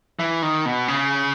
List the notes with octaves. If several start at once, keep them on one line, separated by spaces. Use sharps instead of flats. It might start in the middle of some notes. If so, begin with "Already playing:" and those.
E3
D#3
B2
C#3